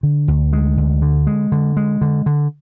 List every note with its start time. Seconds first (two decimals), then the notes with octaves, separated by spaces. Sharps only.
0.03 D3
0.28 D2
0.53 G#3
0.77 D2
1.02 D3
1.27 G#3
1.52 D3
1.77 G#3
2.01 D3
2.26 D3